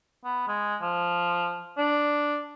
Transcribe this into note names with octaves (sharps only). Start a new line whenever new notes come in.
B3
G#3
F3
D4